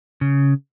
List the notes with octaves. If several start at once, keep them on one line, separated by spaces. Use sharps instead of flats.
C#3